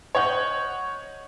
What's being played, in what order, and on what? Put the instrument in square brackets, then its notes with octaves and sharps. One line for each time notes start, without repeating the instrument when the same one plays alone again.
[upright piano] C#5 D#5 F#5 G6